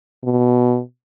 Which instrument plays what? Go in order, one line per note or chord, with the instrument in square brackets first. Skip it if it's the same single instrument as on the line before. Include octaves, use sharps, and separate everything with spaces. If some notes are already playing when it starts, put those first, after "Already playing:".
[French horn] B2